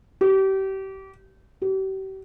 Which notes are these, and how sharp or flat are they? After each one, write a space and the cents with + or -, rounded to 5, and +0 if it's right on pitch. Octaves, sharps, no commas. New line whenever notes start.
G4 -30
G4 -40